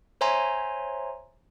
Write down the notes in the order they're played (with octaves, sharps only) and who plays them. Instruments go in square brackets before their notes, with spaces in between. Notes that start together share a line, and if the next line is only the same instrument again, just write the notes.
[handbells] C5 C#5 E5 G#5 A#5 C6